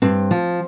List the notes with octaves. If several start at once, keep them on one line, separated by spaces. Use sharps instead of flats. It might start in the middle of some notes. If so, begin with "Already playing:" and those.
G2 C4
F3